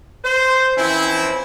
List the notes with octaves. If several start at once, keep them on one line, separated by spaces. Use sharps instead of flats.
C5
E3 F3 C4 C#4 E4